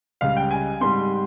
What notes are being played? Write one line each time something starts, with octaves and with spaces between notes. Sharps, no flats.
C#2 C#3 G3 F5
G5
G#5
G#2 G3 C4 C6